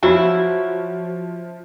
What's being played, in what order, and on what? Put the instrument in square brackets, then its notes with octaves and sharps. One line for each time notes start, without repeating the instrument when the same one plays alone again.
[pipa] C#3 F#3 E4 [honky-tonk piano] F3 [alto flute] F#4